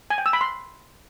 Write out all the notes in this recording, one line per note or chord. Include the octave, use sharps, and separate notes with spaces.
G#5
G5
E6
B5
C6